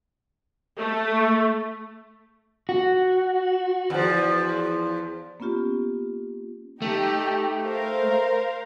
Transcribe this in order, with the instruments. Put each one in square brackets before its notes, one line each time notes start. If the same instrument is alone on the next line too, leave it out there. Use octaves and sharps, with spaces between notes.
[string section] A3
[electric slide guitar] F#4
[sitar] E2 F3
[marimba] A#3 B3 C#4 F4 G4
[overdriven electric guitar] A3 [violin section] D#4 G4
[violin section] A#4 C5 F5